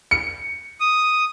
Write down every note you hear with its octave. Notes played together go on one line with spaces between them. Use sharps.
C#7
D#6